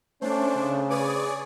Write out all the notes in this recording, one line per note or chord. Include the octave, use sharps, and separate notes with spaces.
A3 C#4 D4 C5
C#3
G#4 B4 C#5 D5